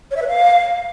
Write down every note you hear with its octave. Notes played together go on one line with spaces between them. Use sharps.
C#5
E5
B4
F5